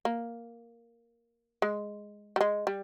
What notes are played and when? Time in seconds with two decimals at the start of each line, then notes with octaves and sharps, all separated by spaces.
0.05 A#3
1.62 G#3
2.36 G3
2.41 G#3
2.67 G3